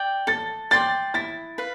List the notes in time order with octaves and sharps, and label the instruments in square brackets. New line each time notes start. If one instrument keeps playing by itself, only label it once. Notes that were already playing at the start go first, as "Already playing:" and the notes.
Already playing: [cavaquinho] D5 G5
[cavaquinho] A4 [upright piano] A6
[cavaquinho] D5 G5 C6 [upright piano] A6
[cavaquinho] E4 [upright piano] A6
[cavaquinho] B4 F5